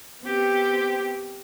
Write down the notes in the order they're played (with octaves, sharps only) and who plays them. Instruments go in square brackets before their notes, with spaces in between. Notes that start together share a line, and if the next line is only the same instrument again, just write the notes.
[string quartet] B3 C4 G4